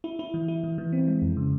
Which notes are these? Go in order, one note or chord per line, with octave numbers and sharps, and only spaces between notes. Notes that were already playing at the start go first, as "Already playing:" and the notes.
E4
E4
E3
E4
E3
E3
C4
G#3
F2
C#3